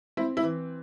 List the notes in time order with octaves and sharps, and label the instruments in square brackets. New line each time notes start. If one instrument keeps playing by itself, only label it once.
[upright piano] C4 E4
E4
E3